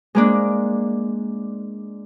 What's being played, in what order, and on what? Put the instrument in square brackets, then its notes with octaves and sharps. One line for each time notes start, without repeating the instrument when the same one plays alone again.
[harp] G#3 A#3 D4